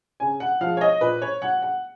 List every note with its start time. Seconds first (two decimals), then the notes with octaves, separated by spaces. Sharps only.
0.20 C#3 G#5
0.40 F#5
0.61 F3 G#3 F5
0.77 C#5
0.81 D#5
1.01 A#2 B4
1.22 C#5
1.42 F#3 F#5
1.62 F#5